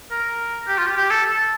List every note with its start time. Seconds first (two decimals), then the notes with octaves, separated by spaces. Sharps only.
0.11 A#4
0.68 G4
0.78 F4
0.87 G4
0.97 G4
1.11 A4
1.25 A4